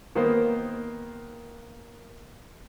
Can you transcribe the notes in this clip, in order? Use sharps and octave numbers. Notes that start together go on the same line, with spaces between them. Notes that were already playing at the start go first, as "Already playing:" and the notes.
D#3 A#3 B3 C5